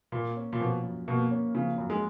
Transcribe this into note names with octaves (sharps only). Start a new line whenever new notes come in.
A#2 A#3
C#4
A#2
B2 F3
F#2
B2 A#3
C#4
C#3 F3
F#2
G#3